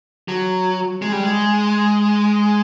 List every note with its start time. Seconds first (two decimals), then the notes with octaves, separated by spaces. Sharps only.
0.28 F#3
1.02 G#3
1.12 G3
1.23 G#3